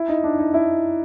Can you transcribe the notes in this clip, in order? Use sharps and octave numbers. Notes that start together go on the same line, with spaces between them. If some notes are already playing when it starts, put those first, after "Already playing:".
Already playing: E4
D#4
D4
D#4
E4